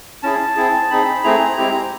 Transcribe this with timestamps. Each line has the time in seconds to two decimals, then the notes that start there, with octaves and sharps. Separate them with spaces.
0.23 C#4 E4 G#4 A5
0.56 C4 E4 G#4
0.90 C4 D#4 G#4 B5
1.23 A3 C4 E4 G#4 A#5
1.57 G#3 C4 E4 G4